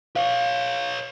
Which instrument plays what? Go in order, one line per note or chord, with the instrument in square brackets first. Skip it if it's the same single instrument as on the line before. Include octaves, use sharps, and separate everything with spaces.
[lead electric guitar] B4 C#5 [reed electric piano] F5